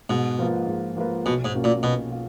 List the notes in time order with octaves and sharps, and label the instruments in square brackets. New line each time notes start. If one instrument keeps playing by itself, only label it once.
[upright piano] G#2 [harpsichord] B2
[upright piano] F3 A#3 F4 B4
G#2
F3 A#3 F4 B4
[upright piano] B1 [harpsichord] B2
[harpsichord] G#2
[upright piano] B2 A#3 C#4 F4
[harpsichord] A#2
[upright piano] B1 [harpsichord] B2
[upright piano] F4